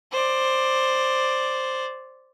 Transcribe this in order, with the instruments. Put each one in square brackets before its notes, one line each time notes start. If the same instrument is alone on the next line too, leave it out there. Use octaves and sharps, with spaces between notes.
[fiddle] C5 D5